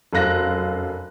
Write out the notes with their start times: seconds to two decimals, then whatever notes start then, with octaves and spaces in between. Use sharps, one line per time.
0.13 F1 F#2 F5 F#6 A#6